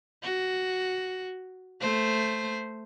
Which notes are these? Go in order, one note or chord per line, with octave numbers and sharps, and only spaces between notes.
F#4
A3 C5